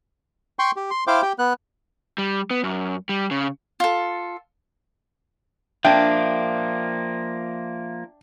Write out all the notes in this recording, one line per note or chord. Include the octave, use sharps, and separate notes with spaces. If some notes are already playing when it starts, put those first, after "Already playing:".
G5 C6 C#6
G4
C6
E4 C5 F5 G5 D6
G4 G5
B3 F#6
G3
B3
F#2
G3
C#3
F4 A4
F3 A#3 D4 E5 G5